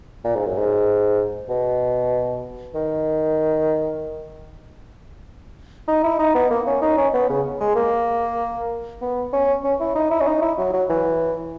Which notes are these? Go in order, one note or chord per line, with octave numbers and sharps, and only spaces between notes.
A#2
G#2
F#2
G#2
B2
D#3
D#4
E4
D#4
B3
A#3
C#4
D#4
C#4
B3
C#3
G#3
A#3
B3
C#4
C#4
E4
D#4
E4
C#4
D#4
E4
F#3
F#3
E3